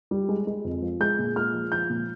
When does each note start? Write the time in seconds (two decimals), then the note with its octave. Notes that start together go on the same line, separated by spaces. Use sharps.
0.11 G3
0.29 G#3
0.47 G#3
0.64 F2
0.82 F3
1.00 G#3 G6
1.19 A#2
1.36 G#3 F6
1.54 F3
1.72 F3 G6
1.90 A#2